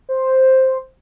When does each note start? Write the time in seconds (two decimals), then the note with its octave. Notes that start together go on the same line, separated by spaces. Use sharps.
0.09 C5